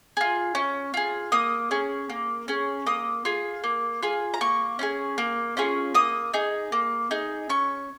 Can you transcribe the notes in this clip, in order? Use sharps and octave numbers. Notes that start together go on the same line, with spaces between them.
F4 G#4
C#4
F4 G#4
A#3 D#6
C#4 G#4
A#3
C#4 G#4
A#3 D#6
F4 G#4
A#3
F4 G#4
A#5
A#3 C#6
C#4 F4 G#4
A#3
C#4 F4 G#4
A#3 D#6
D#4 G#4
A#3
D#4 G#4
C#4 C#6